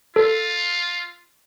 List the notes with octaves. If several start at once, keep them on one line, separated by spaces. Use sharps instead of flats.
F4 A4